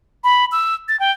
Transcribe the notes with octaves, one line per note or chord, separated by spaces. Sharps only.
B5
E6
A6
G5